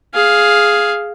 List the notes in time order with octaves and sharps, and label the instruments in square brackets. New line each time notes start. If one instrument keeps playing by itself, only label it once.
[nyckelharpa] G#4 F5